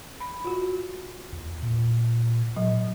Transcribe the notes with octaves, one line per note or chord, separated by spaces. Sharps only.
B5
F4 F#4
E2
A#2
A#2 F#3